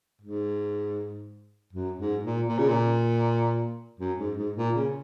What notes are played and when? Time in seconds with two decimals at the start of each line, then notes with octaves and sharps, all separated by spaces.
0.22 G#2
1.73 F#2
1.99 G#2
2.24 A#2
2.48 A#2
2.58 C#3
2.69 A#2
4.00 F#2
4.19 G#2
4.38 G#2
4.57 A#2
4.75 C#3